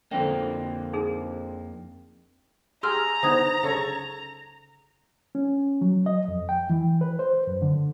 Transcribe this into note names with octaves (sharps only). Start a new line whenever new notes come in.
F2 D3 A#3 C4 D4 G5
D#4 G#4 A#4
G4 G#4 A#5 C6 E6 F6
D3 B3 D#4 C5 D#6 G#6
C#3 A4 C#5
C#4
F#3
D#5
F2
G5
E3
B4
C5
F#2
D3